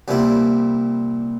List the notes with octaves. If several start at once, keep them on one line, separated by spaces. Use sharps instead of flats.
C2 A#2 G3 C4 E4